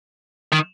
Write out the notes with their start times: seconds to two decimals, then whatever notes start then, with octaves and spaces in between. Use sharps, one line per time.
0.53 D#3